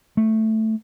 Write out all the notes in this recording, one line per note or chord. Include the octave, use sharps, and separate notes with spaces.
A3